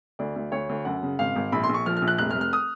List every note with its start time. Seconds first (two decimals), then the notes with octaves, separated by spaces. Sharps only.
0.19 D2 D5
0.36 D2
0.52 D2 C#5
0.69 D2
0.85 F#2 F#5
1.03 C#3
1.19 G#1 F5
1.36 G#1
1.52 A#1 B5
1.64 C6
1.69 A#1
1.74 C#6
1.86 F3 F6
1.97 F6
2.02 A#1
2.08 F#6
2.18 F1 F#6
2.31 F6
2.35 F1
2.41 F6
2.53 D#6